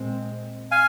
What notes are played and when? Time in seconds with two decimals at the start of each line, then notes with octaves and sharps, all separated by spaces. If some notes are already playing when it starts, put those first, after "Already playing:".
Already playing: A#2 G#3 C4
0.71 F5 G#5